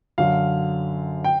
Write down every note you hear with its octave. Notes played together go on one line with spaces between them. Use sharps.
F#2 D3 F#3 F5
G5